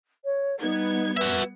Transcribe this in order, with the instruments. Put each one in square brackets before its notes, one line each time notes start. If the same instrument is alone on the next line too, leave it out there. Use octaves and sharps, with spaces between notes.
[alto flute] C#5
[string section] G3 B3 G#6 [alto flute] D#4
[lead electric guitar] F#4 E5 [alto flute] B4